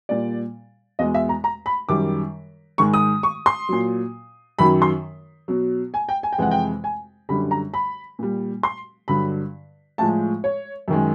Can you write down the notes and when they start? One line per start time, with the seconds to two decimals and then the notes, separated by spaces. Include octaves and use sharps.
0.09 A#2 G3 D5
0.99 E2 B2 G#3 D#5
1.14 E5
1.29 A#5
1.44 A#5
1.66 B5
1.89 F#2 D#3 G3 D6
2.78 G#2 D#3 G#3 C#6
2.94 D#6
3.23 C#6
3.46 C6
3.69 A#2 F#3
4.59 F#2 D#3 F#3 B5
4.82 C6
5.48 B2 F#3
5.94 G#5
6.09 G5
6.23 G#5
6.33 G5
6.38 F2 C3 E3 G#3 F#5
6.51 G5
6.84 G#5
7.29 F#2 D3 G3 B5
7.51 A#5
7.74 B5
8.19 A#2 G3
8.63 C6
9.08 G2 D3 F#3 B5
9.98 A2 F3 G#3 A5
10.44 C#5
10.88 F#2 D#3 G#3